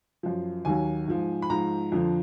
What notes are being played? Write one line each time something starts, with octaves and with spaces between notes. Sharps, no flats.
F#2 F3
D#2 D#3 F#3 G#5
G#2 F3
B5
G#2 F3 A#5
F2 D3 F3